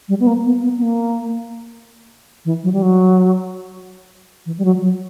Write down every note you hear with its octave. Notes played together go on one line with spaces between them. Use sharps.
G3
B3
A#3
B3
B3
B3
A#3
E3
F#3
G3
F#3
E3
G3
F#3
F#3